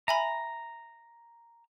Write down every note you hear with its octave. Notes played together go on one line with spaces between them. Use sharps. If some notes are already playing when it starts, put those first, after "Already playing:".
E5 G#5 A#5 B5